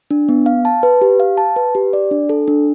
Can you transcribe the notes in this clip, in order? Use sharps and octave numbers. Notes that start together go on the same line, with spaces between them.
D4
B3
F5
A5
B4
G4
F5
A5
B4
G4
D5
D4
A4
D4